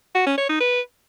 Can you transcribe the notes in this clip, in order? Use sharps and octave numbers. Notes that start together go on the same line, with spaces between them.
F#4
C#4
C#5
D#4
B4